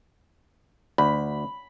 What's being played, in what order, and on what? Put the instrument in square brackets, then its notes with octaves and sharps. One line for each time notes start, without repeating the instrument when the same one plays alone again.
[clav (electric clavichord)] D2 [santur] B5